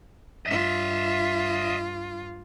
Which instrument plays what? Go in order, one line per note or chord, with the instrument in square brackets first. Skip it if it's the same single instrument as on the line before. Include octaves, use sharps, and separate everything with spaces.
[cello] G2 F4 [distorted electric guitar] D#5 E5